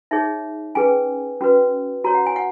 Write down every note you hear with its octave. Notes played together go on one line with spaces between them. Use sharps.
D#4 G#4 C#5 E5
C#4 G#4 B4 G#5
C#4 F#4 B4
F#4 C#5 A#5
F#5
G#5
F#5